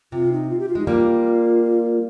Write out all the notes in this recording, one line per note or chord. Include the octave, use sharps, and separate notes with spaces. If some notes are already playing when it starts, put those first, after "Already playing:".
C3 F4
D#4
F4
G4
F4
G#3 D#4
G3 A#3 F4